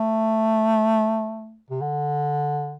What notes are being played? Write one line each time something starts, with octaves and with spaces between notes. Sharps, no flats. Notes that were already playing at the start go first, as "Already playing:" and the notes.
Already playing: A3
C3
D3